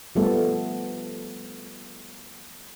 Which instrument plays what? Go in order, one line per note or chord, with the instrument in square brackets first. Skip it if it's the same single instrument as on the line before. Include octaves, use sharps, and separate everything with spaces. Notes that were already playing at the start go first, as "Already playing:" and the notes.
[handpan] F3 G3 A3 B3 A4